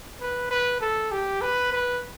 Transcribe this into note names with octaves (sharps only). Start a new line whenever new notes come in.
B4
B4
A4
G4
B4
B4